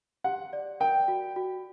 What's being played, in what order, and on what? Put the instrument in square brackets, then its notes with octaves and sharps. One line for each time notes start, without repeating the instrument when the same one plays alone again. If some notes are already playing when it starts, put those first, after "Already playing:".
[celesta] G4 [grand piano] F#5
[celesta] D5
[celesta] A#4 [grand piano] G5
[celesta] F#4
F#4